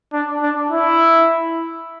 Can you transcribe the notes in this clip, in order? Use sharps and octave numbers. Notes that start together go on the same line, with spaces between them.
D4
D4
E4